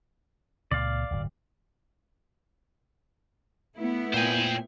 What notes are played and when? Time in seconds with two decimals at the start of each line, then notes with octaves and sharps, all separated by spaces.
0.71 C#2 A#2 D5 F5
1.11 D1 G1 F#3
3.75 A3 B3 E4
4.14 A#2 C5 G5 G#5 C7